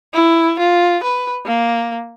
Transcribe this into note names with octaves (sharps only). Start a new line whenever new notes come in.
E4
F4
B4
A#3